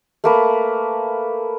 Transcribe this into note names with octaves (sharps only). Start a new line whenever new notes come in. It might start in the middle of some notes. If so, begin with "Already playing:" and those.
A3 A#3 B4